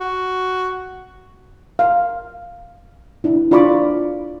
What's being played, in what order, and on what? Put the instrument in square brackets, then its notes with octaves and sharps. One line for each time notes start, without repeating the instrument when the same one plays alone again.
[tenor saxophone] F#4
[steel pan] F5
D4 E4
D4 F4 D5 B5 C#6 D6